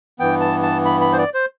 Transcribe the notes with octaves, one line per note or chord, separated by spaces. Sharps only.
G2 E3 B3 G5
A5
A5
B5
B5
C5
D5
C5